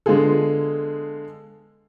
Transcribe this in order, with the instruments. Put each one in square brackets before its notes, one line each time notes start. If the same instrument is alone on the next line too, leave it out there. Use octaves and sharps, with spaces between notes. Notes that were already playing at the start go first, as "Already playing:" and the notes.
[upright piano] D3 G#3 B3 F4 G#4 A4